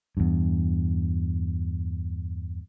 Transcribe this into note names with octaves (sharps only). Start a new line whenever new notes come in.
E2 G2